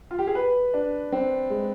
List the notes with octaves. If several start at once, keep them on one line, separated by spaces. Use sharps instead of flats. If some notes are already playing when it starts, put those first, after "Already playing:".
F4
G4
G#4
B4
D4
C4
G#3